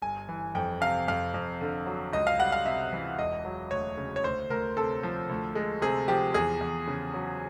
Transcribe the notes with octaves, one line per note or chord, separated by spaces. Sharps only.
G1 G#5
E3
F2 G5
C3 F5
F2 F5
F2
D3
F#3
C#2 D#5
F5
G3 F#5
F5
C3 E5
E3
E1 D#5
F#3
D2 C#5
C#3
C#5
D2 C5
D2 A#4
C3 A4
F3
D2
G#3
C3 G#4
F3 G4
E2 G#4
E2
C#3
F#3